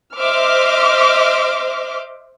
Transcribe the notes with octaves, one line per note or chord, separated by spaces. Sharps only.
C5 D#5 E5 C6 D6 F6